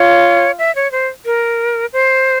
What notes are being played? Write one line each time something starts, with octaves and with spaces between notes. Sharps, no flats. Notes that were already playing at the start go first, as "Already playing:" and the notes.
Already playing: F4 C#5
E5
C#5
C5
A#4
C5